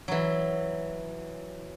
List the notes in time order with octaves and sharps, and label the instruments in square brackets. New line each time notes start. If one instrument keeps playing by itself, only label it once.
[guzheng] E3 F#3